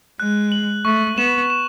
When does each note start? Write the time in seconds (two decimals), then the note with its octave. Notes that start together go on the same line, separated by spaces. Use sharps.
0.19 G#3 F#6
0.52 F#7
0.85 A3 C#6
1.17 B3 E7
1.50 E7